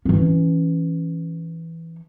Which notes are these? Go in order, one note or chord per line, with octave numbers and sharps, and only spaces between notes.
E3 C#4